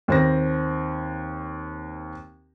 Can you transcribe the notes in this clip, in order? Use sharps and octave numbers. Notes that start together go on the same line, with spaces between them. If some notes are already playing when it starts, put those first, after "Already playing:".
D#2 C4 A#6